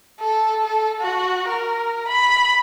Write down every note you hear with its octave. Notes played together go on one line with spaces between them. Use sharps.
A4
A4
F#4
A#4
B5